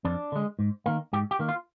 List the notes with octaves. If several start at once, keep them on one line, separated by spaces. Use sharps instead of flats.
F2 D4
D3 G#3
G#2
D#3 A#3
G#2 G4
G4
D#3 A#3
F4